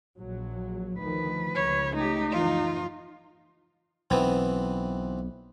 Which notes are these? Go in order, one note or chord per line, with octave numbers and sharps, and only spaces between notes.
A#1 F#3
D2 D#3 F3 B4
C#2 C#5
A3 D#4 G4
F#1 E3 F3 F4
B1 E3 B3 C4